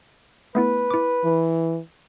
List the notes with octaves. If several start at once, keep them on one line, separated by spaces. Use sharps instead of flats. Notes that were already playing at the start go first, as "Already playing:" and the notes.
A3 B3 E4 B4
E4 D6
E3